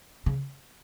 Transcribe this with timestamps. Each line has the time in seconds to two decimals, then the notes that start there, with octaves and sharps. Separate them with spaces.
0.26 C#3